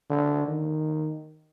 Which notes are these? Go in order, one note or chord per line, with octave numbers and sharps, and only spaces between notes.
D3
D#3